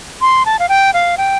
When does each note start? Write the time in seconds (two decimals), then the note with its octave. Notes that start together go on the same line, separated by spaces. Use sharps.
0.21 C6
0.46 A5
0.59 F5
0.69 G5
0.94 F5
1.18 G5